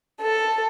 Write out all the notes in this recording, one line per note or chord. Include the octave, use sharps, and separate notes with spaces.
A4